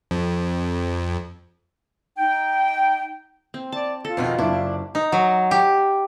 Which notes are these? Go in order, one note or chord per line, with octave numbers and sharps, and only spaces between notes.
F2
D#4 G5
C4
D5 A5
F4 A4
F2 B2 D#3
F#1 D4 E4 D6
D#4
F#3
G4